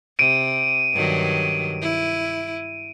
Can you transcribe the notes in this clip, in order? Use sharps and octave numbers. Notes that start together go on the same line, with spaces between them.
C3 D7 D#7
G2 D#3 F#3
E4